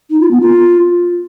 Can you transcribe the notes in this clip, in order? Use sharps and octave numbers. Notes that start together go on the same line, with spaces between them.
D#4
F4
B3
F4